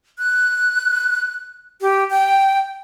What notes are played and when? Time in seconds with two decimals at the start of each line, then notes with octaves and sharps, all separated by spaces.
0.19 F#6
1.81 G4
2.11 G5